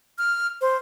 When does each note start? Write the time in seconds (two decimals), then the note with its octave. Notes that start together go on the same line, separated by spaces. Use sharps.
0.18 F6
0.61 C5